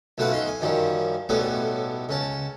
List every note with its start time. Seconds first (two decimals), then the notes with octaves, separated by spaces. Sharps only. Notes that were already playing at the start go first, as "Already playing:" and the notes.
0.18 B1 B2 A3 F4 B4 F#5
0.31 C#4 D#4 C6
0.48 G#5
0.61 F#2 D#3 F3 G3 C#4
1.29 B1 A2 G3 B3 C#4 A4
2.09 C#2 C#4 A5